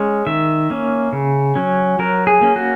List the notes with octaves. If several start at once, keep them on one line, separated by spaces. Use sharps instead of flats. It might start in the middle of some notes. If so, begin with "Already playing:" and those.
Already playing: G#3 C#4
D#3 E5
A#3 C#4
C#3
F#3 C#4
F#3 A#4
G#4
A#3 C#4
F#4